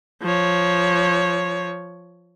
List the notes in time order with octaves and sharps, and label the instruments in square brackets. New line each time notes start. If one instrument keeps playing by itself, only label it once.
[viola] F3 C#5